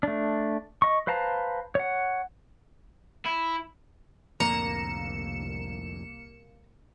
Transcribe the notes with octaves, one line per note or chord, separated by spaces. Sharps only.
A3 D4
D#5 C#6
B4 C5 F5 A5 A#5
C#5 F#5
E4
C2 F2 A2 D3 A#3 A#5 C#7 E7